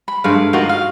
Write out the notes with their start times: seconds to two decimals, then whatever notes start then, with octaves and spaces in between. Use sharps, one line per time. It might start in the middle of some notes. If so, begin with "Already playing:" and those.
0.08 B5
0.24 G2 G#3 A3 F5
0.53 D#4 F4 F#4 A#4
0.69 F5